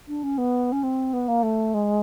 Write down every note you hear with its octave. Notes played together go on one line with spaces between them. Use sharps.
D4
C#4
B3
C#4
C4
B3
A#3
A3
G#3